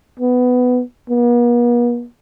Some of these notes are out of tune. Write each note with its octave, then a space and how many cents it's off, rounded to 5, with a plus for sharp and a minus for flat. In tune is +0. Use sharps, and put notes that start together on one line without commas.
B3 +10
B3 -45